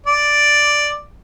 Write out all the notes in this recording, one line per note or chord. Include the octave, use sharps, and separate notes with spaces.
D5